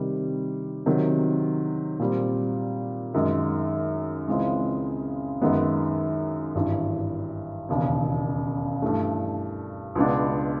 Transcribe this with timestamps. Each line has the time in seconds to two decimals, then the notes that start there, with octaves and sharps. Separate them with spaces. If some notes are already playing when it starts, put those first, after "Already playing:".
Already playing: C3 D#3 G3
0.86 C3 D#3 F#3
2.00 A#2 G3 C4
3.14 F#2 D#3 G#3
4.28 C#2 C#3 E3 G#3 C4
5.41 F#2 D#3 G#3 B3
6.55 G#1 G2 E3
7.69 E1 D#2 C#3
8.82 G2 E3 A3
9.95 C#2 B2 G#3 B3 D4